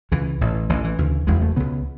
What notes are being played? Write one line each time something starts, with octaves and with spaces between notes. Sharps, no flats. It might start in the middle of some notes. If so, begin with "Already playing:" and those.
C#2 C#3 E3
A1 A2
A1 A2 E3
E3
D2 C#3
F#1 E2 C#3 G#3
A3
C#2 C#3 B3